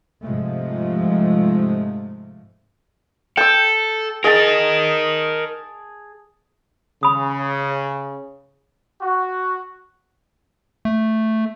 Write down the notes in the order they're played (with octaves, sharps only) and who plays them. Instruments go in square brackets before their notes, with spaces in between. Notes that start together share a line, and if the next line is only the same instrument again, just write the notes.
[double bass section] G#2 C3 F3 G#3 A3
[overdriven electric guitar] A4 [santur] G5 E6
[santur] G#4 A5 [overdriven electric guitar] A#4 D#5
[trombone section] C#3 [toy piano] B5 D#6
[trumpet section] F#4
[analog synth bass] A3